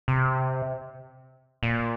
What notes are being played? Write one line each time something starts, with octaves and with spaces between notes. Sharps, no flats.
C3
A#2